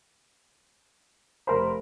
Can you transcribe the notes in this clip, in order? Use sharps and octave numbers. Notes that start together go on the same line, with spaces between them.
F1 A#4 C5 B5